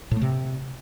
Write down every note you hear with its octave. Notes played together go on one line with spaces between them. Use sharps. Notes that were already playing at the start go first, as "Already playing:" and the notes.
A2
A3
C3